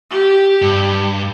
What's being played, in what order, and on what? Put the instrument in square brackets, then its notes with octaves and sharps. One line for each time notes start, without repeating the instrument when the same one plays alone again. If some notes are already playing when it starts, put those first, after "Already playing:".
[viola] G4
[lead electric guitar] G2